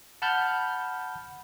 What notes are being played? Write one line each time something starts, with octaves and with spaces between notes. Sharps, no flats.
F#5 A5 B5 F6 G6